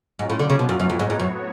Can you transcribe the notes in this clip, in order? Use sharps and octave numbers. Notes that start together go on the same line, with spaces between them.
G#2 F#3 C#4 F4
A2
D3
C#3
B2
F#2
F#2 A2 F#3 B3 F#4 C#5
F2
G#2
G#2
F#2